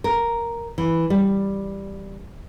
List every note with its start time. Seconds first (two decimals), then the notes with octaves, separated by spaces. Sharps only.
0.04 A#4
0.78 E3
1.10 G3